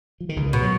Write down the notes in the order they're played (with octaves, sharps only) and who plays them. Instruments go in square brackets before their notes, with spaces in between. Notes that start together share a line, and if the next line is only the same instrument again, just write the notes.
[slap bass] F3
D#3
C#2 C#3
[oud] B2
[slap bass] F#3